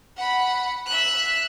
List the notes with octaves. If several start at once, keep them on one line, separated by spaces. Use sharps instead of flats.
F#5 B5
E5 F#6